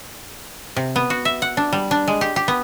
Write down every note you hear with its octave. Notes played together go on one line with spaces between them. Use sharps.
C3
B3
F#4
E5
F#5
D4
G3
D4
G#3
G4
G4
B3